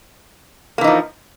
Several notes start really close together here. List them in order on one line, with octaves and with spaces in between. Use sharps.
A#3 E3 D#4 F3